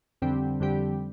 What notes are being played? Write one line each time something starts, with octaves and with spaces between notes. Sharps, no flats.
F2 D3 G3 C4 G4
F2 D3 G3 C4 G4